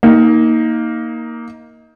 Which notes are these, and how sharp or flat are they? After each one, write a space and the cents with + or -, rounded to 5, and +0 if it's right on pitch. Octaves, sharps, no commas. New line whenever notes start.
A#3 +0 D#4 +20